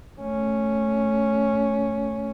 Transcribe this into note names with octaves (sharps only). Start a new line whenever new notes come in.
A3 C#4